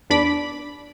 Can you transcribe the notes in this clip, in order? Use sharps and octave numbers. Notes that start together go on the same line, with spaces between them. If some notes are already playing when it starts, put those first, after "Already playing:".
E2 D4 B5 D6